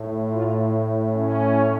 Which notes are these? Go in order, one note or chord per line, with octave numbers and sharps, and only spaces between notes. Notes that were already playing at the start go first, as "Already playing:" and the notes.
Already playing: A2
F4
C#4